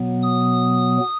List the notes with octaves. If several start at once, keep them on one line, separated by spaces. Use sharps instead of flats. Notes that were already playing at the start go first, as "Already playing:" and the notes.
Already playing: B2 F#3 B3
D#6